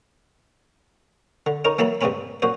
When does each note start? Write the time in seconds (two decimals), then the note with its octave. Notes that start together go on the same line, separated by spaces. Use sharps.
1.46 D3
1.65 C#4 D#4 A#4
1.79 E3 F#3 A#3 E5 A5 B5
2.01 C#2 G2 C#3 C4 C#4 B5
2.42 F#2 A#2 F#4 C5